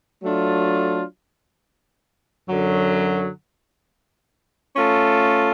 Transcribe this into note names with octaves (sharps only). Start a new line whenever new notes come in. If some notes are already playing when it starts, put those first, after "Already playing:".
F#3 A3 D4 F4
F#2 D3 F#3
A3 C#4 F4 A4